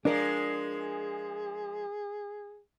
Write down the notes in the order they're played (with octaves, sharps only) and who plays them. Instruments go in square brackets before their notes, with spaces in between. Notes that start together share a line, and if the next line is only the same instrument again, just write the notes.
[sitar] F3 G#3 [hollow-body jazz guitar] D4 A#4 D5 [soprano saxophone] G#4